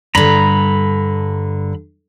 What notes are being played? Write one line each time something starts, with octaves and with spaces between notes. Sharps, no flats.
G2 D3 A#5 B5